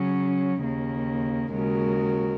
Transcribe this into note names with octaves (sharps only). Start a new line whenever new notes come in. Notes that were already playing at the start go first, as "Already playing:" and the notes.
Already playing: C#3 F#3 C#4
D#2 C#3 A#3
D#2 C#3 G#3 F#4 A#4